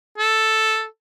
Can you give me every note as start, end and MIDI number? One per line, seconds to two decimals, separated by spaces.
0.18 0.85 69